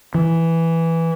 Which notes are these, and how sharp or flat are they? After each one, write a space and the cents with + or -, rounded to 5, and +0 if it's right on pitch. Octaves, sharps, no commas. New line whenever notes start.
E3 +0